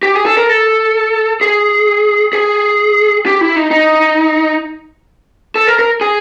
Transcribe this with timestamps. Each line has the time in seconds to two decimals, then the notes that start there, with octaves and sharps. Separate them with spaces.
0.03 G4
0.15 G#4
0.26 A4
0.37 A#4
0.49 A4
1.41 G#4
2.33 G#4
3.26 G4
3.41 E4
3.56 D#4
3.71 D#4
5.55 A4
5.67 A#4
5.79 A#4
6.01 G#4